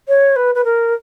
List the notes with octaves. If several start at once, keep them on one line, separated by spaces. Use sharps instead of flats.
C#5
B4
B4
A#4